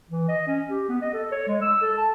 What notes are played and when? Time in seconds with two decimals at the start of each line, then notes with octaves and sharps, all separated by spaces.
0.10 E3
0.28 D#5
0.47 C#4
0.70 G4
0.89 B3
1.02 D#5
1.13 A4
1.32 C#5
1.47 G#3
1.62 E6
1.82 A4
1.97 A5